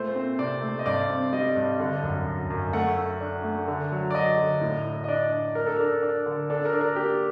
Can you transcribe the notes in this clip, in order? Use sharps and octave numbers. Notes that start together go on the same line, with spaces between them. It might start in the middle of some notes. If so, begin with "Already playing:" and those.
Already playing: A#2 A3 C5
C4
C3 D5
A3
D#5
G2 D5
C4
G3 D#5
G2
D3
F#2
F#2
F#2
A3 F#5
A3
D4
A3
D3
F#3
D5
F#3 D#5
D3
A2
A2
D#5
D4 D5
D4
D4 A#4
A4
D4 A#4
D4
D3
D4 A4
A#4
D4
A#4
A#3 G4